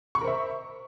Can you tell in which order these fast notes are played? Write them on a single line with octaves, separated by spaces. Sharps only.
C#6 B5 A#4 C5 E5